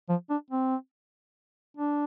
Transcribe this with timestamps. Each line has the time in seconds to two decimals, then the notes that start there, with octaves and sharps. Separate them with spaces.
0.09 F3
0.30 D4
0.50 C4
1.77 D4